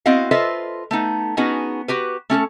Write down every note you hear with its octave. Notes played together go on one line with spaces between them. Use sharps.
B3 C4 E4 F#4 D#5 F5
F4 A4 B4 C5 D#5 E5
A3 B3 D#4
B3 C#4 D#4 F#4 G#4
F#4 G4 B4
A3 C#4 G#4 A4